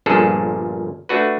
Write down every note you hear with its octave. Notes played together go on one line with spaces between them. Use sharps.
G1 A#2 F3 D4 G#4 A4
A3 D4 F#4 B4